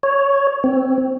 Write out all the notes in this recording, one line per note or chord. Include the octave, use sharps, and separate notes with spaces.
C#5
C4